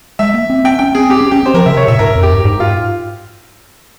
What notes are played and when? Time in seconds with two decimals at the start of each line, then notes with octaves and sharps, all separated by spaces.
0.19 G#3 E5
0.34 A#3
0.50 C4
0.64 C4 G5
0.79 C#4 G5
0.95 C4 G#4
1.10 C4 G4
1.21 C#4
1.31 C#4 G4
1.43 C4 C5
1.54 F3 A#4
1.66 C#3 E5
1.77 C3 C#5
1.88 A#2 E5
1.99 G#2 A#4
2.15 F2
2.23 G4
2.29 G2
2.44 G#2 G4
2.60 F4